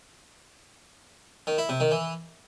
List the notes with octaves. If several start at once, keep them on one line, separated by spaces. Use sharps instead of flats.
D#3
E4
C3
D#3
E3